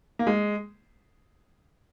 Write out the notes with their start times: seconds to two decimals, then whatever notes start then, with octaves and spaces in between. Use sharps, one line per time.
0.19 A#3
0.27 G#3